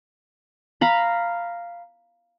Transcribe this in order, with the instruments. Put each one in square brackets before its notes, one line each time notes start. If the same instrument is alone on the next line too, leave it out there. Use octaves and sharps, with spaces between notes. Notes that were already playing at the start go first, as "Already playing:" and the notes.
[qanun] F5 A#5 B5